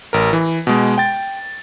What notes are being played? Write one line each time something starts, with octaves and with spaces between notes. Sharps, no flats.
A1 A#4
E3
B2 G#3
G5 A6